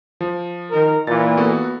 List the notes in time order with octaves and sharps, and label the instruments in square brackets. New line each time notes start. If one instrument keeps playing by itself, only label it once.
[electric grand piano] F3
[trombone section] D#3 A#4
[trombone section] A#2 E3 A#3 [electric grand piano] A6
[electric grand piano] B3 F#4 A4